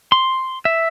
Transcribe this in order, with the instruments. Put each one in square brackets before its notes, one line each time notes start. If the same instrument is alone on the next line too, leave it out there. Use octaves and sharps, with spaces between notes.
[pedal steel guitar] C6
E5